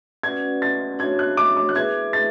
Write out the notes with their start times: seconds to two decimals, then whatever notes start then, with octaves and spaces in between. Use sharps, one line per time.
0.23 C#4 F#4 B4 D5 F#5 G#6
0.62 A6
0.99 D4 F#4 C#5 G#6
1.19 F#6
1.37 D6
1.57 D6
1.69 F#6
1.75 E4 G#4 B4 E5 G#6
2.13 A6